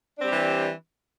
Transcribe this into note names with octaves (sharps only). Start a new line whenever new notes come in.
E3 G3 C4 D4 G4